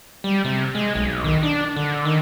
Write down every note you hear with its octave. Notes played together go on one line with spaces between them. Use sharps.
G3
C3
G#3
B1
D#3
D4
D3
D#3